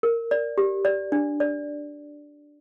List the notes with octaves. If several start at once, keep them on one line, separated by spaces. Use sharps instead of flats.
A#4
D5
G4
D5
D4
D5